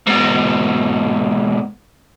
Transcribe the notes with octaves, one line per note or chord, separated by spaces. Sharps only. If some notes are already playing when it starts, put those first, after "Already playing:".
G#2 B2